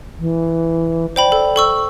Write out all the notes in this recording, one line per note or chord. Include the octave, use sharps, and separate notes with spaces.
E3
C5 D5 G5 B5
A4
A4 C#6 E6